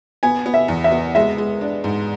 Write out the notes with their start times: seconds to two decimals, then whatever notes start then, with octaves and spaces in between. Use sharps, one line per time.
0.23 B3 G#5
0.46 B3
0.54 E5
0.68 E2
0.84 E5
0.92 B3
1.15 G#3 E5
1.38 G#3
1.61 D4
1.84 G#2